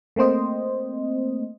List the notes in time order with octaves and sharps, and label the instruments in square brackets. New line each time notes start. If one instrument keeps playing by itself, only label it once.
[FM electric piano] A3 A#3 C4 C5 D#5